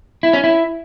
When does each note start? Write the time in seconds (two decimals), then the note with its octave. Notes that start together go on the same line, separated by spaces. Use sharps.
0.23 E4
0.33 C#4
0.44 E4